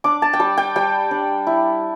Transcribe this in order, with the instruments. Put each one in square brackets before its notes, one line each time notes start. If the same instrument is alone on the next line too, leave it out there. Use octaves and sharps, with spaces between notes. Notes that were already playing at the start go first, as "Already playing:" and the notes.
[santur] D4 D6
A5
G5
G3 A5
G5
G3 G5
D4
E4